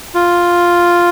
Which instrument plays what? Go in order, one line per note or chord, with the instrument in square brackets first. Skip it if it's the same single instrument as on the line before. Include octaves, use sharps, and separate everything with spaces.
[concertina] F4